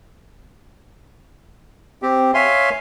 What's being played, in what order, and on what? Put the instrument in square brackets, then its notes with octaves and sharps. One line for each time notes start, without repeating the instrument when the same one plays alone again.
[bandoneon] C4 G4
C#5 E5 F5 G#5 C6